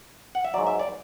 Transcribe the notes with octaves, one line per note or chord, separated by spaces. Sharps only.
F#5
E5
G#2 F#3 D5
E5
D5